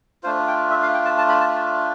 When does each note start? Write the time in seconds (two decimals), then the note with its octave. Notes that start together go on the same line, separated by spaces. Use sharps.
0.23 A3 D4 F4 C5
0.48 G5
0.70 E5
0.83 F5
0.94 G5
1.05 A5
1.18 A5
1.29 B5
1.40 A5